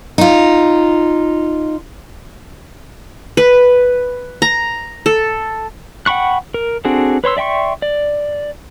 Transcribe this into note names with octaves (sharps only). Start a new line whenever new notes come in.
D#4 F4
B4
A#5
A4
F#5 G5 B5 C#6 F#6
A#4
C4 D4 F#4 G#4 A4
B4 C#5 C6 E6
D5 E5 G5 C6 C#6
D5